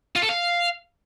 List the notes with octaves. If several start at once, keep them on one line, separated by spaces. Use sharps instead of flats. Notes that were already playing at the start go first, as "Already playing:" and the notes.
F4
A4
F5